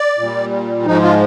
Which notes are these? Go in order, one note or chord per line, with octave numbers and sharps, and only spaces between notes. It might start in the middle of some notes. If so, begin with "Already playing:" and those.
Already playing: D5
A#2 G3
G#2 F3 G#3 D#4
F4